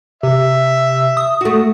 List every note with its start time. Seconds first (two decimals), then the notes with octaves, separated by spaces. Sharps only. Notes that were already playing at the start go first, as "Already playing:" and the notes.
0.23 C3 E5
1.17 D#6
1.41 A3 F#4